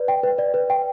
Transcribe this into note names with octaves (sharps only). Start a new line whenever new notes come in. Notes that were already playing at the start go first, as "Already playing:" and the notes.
Already playing: B4 D5
G5
B4
D5
B4
G5